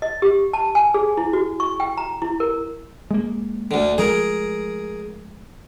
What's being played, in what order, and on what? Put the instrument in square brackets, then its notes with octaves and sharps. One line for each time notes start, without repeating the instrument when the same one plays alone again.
[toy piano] D#5
G4
A5
G#5
G#4
E4
F#4
C#6
G5
A#5
E4
A#4
[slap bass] G#3 A#3
[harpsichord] D2 D3
[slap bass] F3 G#3 A3 [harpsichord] G#4 A#4